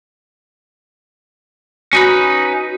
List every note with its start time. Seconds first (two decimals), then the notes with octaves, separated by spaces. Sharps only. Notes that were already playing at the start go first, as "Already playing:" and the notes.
1.93 C#4 D#4 F#4 B4